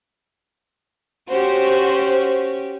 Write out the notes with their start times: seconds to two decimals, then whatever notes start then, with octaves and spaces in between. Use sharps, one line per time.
1.30 C#4 F#4 G4 C5